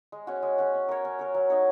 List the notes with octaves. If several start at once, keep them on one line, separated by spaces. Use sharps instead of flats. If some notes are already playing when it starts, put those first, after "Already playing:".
G#3
C#4 F#4
G#3
C#4 F#4
C#4
A#4 C#5
C#4
A#4 C#5
F#3
D#4 A#4 C#5